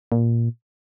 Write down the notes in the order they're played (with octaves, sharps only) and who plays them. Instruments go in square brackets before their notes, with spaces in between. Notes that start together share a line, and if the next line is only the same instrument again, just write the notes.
[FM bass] A#2